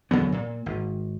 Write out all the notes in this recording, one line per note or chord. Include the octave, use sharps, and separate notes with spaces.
D2 C#3 F#3 B3
A#2
G#1